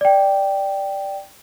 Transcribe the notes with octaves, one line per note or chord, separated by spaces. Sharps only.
D5 G5